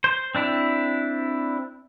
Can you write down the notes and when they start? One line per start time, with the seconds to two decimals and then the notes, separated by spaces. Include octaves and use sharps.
0.04 C5
0.35 C4 D4 E4